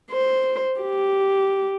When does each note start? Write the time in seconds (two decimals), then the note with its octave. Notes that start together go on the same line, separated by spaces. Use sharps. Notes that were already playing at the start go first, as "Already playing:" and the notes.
0.11 C5
0.81 G4